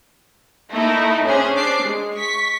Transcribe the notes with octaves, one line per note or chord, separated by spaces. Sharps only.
A3 A#3 D#4 E4
C#4 D4 G#4 C5
D4 D6 C7
G#3
C#6 B6